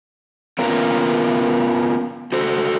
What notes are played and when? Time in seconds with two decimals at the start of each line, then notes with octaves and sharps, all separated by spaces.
0.59 B3 C#4 F4 A#4
2.32 F#4 A4 C5